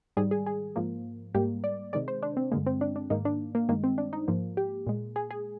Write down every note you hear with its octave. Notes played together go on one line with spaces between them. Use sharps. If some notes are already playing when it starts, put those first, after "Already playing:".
G#2 D#3 G3 G#4
G#4
G#4
G#2 F3 A#3
G#2 G3 A#3 G4
D5
C3 D#3 G#3 D5
C5
D4
C4
G2 D3 G#3 A#3
C4
D4
D4
G#2 D#3 A#3 D#4
D4
A#3
G2 D#3 G#3 A#3
C4
D4
D#4
G#2 F3 A#3
G4
A#2 G#3
G#4
G#4